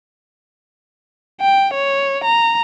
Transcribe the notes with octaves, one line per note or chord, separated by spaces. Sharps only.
G5
C#5
A#5